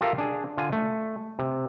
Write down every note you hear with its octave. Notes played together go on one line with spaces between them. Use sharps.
F4 G4 A4 A#4 E5 F5
D4 G#4
D3 F4 G#5
A3
C3